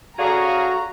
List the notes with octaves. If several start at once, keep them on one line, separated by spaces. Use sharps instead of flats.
C#4 F#4 G#4 A4 D5 F5 A#5